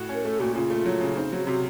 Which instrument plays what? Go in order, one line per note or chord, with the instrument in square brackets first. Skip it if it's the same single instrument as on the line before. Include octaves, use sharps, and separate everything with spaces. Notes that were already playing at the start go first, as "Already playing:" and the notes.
Already playing: [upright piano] A2 F#4
C#4
[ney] A#4
[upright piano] A3 [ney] A4
[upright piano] A#2 [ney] F#4
[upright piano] C#3 [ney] F4
[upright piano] A3
F#3
C#3
[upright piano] C4 [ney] D#4
[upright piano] F#3 [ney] F#4
[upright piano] C3 [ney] F#4